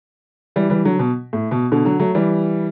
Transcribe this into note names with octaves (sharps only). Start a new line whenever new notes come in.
E3 G3
E3 G3
D3 F#3
B2
A2
B2
B2 D3
D3 F#3
F#3 A3
E3 G3